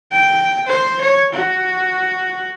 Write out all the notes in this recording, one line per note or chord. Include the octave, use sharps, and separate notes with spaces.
G5
C5
C#5
F#4